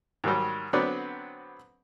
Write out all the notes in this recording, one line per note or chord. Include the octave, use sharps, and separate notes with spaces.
G#2 D#3 F#3 G3
D3 F#3 B3 C4 B4 D5